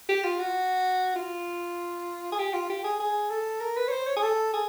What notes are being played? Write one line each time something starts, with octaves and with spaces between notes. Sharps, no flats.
G4
F4
F#4
F4
G#4
G4
F4
G4
G#4
G#4
A4
A#4
B4
C#5
C5
C#5
G#4
A4
G#4